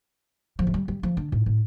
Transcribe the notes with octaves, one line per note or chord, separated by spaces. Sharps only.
F3
A3
G3
G3
F3
D3
A2
A2